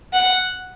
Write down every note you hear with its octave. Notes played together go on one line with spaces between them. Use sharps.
F#5